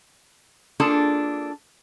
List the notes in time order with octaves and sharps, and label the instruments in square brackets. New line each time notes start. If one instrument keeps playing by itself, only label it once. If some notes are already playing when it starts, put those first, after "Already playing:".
[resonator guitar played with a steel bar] A#3 D4 F4 G#4 A4 A5